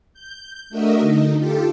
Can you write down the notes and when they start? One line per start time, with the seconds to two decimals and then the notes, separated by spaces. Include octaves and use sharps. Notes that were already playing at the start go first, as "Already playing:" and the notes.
0.14 G6
0.70 A3 D4 F#4 A#4 D#5 E5
1.00 D3 D#4
1.38 F4 G4 A4